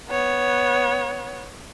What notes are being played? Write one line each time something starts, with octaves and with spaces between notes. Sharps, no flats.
B3 C#5